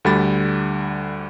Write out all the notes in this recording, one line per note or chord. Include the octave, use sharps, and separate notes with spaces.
D2 D3 G3 B5 A6